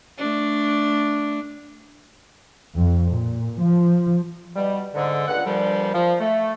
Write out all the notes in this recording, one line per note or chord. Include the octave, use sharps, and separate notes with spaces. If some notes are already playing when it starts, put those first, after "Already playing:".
A3 D4
F2
A#2
F3
B2 G3
G#2 D3
C#2 G2 A#2 F#5
G2 A#2 D3 F3 G3
F3
A3